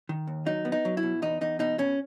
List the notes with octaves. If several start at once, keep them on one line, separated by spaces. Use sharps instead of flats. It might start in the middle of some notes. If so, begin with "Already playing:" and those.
D#3
D#2
F#3 D#4
B3
D#4
F#3
E4
B2
E2 D#4
E2 D#4
B2 D#4
B2 C#4